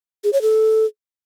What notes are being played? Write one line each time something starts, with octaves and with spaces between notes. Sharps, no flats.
G#4
C#5
A4